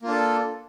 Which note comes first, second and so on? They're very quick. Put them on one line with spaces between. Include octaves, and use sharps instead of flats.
A#3 F4 D4 A4